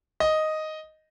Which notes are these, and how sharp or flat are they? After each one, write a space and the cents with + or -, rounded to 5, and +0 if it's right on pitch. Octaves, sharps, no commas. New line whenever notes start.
D#5 +0